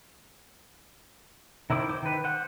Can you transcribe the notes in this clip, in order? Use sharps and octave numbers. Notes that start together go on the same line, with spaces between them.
D#3 E4 C5 D6
C5 D6
D#3 B4
C5 F#5